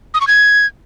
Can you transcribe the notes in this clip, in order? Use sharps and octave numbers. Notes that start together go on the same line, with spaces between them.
D#6
C#6
G#6